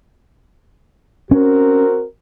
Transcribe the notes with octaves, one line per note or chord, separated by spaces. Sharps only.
C4 C#4 F#4 A#4